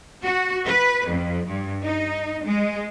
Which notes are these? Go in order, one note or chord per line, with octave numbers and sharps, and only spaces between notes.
F#4
B4
F2
G2
D#4
G#3